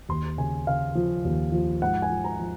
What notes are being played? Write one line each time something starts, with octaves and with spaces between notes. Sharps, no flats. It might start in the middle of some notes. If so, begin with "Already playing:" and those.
D#2 C6
C#3 G#5
C#3 F5
F3
D#2
F3
G#2 F#5
G#5
F3
A#5
F3